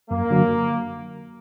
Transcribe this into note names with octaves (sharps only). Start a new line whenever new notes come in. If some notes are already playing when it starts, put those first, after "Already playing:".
F#2 A#3
D3 F#3